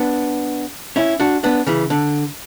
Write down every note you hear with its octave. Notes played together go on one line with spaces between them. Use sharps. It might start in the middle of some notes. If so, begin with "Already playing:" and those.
Already playing: B3 D4
C#4 E4
D4 F#4
B3 D4
C#3 E3
D3